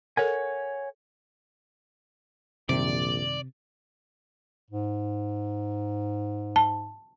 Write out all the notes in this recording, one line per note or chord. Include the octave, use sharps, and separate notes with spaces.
A4 A#4 C#5 F#5 G#5
A#1 F#2 C3 D#3 G3 D5
G#2
A5